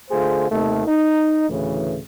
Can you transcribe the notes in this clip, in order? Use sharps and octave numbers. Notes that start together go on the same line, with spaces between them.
D3 A3 F4 G#4 C5
D#2 C3 D#3 A3
D#4
D2 A2 C#3 E3